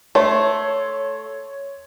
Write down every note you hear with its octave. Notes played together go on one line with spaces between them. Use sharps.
A3 C#5 C6